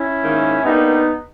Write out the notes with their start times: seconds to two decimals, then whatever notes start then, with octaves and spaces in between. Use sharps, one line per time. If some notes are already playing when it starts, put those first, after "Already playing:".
Already playing: C#4 E4
0.20 G#2 D#3 A#3
0.64 G2 G3 A#3 B3 D#4